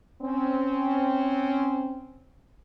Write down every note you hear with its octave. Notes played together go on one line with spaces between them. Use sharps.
C4 C#4